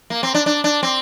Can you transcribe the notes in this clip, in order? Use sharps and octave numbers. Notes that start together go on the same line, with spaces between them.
A#3
C4
D4
D4
D4
C4